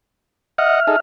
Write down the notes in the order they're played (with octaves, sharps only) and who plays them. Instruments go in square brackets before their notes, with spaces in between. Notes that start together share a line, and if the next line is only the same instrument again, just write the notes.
[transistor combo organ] D#5 F#5 [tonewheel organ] E5 F6
[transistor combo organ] D#4 G#4 A4